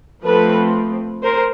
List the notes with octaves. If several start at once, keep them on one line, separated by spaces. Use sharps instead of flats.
F3 A3 C4 A4 B4
A#4 C5